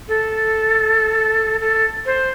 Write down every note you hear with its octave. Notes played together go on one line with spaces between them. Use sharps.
A4
A4
C5